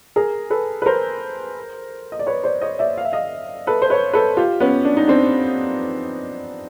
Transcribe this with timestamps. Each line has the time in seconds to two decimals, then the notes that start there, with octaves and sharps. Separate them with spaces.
0.16 G#4 A#4
0.50 A4 B4
0.82 B4
0.86 A#4 C5
2.12 D#5
2.19 D5
2.27 B4 C#5
2.44 C5 D5
2.61 C#5 D#5
2.79 D5 E5
2.98 F5
3.05 E5
3.12 D#5 F5
3.67 A4 B4
3.82 C5
3.90 B4 C#5
4.13 A4 B4
4.37 F4 G4
4.60 B3 C#4
4.85 D4
4.97 D#4
5.08 C4 D4